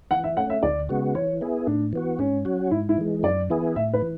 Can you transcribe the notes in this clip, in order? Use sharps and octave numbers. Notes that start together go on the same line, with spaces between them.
E3 F#5
E5
A3 C#4 F#5
E5
D2 D5
C#3 G#3 B3 F#4
E3 C#5
B3 E4 G#4
A2 D4
E3 B3 F#4
G#2 C#4
F#3 C#4 F#4
G#2 E4
E4
E3 G#3
F#2 D5
E3 B3 E4 G#4
A2 E5
B4
E3